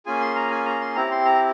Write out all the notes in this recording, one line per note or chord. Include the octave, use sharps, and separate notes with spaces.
A#3 C#4 F4 G#4 G#5
C6
A#5
G#5
A#5
C6
C4 E4 G4 A#5
C6
A#5